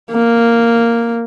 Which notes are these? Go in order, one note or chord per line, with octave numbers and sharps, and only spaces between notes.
A#3